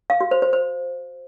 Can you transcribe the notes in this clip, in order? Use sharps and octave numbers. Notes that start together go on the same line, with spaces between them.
F5
F#4
C5
C5
C5